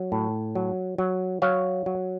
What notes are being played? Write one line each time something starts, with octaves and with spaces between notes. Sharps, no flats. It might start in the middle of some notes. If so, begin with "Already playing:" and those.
Already playing: F#3
A2
F#3
F#3
F#3 C#5 F5
F#3